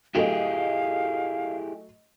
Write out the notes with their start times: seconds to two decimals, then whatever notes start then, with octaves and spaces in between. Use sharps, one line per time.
0.15 F#3 A3 E4 G4 G#4 D#5 F5